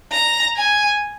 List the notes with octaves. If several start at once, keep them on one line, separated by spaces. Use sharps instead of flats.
A#5
G#5